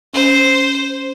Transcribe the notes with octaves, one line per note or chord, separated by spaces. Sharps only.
C#4 C5